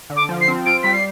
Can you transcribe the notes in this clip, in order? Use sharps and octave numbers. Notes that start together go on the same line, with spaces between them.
D3
D6
F3
C7
C4
F4 D7
G3 B6
C7